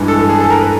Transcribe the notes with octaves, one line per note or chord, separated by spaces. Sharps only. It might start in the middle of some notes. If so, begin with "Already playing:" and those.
Already playing: G2 E3 G#3
A4
A4
G#4
A4
A#4
B4